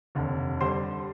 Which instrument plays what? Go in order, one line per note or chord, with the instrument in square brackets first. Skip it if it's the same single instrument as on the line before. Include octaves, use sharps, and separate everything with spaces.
[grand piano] F1 D#2 D3
D3 G3 C5 C6